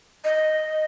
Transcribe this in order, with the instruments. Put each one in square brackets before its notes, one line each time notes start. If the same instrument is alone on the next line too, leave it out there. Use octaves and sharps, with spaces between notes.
[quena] D#5